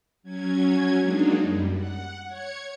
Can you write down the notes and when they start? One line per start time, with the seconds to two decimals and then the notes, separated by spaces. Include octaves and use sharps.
0.23 F#3 C#4 G#6
0.98 F#3 G#3 A#3 D4 D#4
1.39 F#2 G3
1.73 F#5
2.26 C#5 G#6 C#7